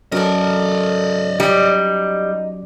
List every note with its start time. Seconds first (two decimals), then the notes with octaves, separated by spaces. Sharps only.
0.12 F#3 C#4 F#4 A4 A#4 D5 D#5
1.40 G3 D#4